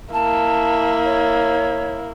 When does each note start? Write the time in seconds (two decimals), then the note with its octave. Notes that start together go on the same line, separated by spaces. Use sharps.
0.13 A#3 E4 A5
1.04 C#5